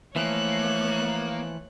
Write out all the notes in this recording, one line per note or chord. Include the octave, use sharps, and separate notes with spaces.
E3 F3 A3 A#3 C#5 F#6